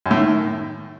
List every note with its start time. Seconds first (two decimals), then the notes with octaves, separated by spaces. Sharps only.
0.06 F#2
0.11 A2
0.16 D#3